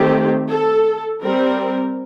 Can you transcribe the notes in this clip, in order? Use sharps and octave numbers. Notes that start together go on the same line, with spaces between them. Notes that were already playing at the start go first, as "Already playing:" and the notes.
Already playing: D#3 A3 C4 G4
A4
G3 C4 A#4